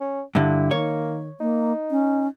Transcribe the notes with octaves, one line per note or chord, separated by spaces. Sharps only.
C#4
G2 D3 E4
D#3 A#3 C#5
A#3 D#4
C#4